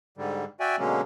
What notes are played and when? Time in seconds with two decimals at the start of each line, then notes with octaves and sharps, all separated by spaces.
0.18 G#2 D3 G3
0.60 F#4 D5 E5 G5 G#5
0.79 B2 D3 F#3 G#3 A#3 C#4